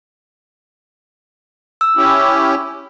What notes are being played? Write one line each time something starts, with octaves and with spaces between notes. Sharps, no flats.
E6
C#4 E4 G4